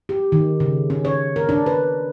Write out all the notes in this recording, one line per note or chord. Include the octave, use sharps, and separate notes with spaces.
G4
D#3
C#3
C#4
C#5
A#4
D4
B4